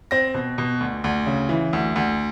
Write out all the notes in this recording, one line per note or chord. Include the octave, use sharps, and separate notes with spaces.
C4 A#6
B2
B2
D2
D2
C#3
E3
D2
D2